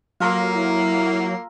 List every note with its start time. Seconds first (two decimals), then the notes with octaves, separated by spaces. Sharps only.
0.20 F#3 A#3 F4 A4 A#4
0.55 E4